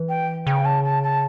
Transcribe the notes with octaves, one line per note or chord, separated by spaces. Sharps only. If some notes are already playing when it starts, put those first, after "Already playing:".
Already playing: E3
G5
C#3 G5
A5
A5
A5